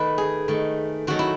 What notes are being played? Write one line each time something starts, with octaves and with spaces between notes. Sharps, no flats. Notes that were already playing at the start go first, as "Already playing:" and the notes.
Already playing: D#3 A3 B4
G#4
D#3 A3
D#3 F#3 A3 F#4
E4